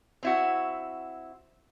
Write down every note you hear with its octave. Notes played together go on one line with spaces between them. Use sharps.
C4 E4 F#4